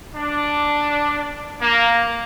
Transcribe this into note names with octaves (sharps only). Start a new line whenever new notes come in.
D4
A#3